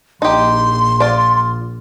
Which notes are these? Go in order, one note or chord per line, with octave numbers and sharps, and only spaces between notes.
A#1 D#4 G4 C6
F4 D5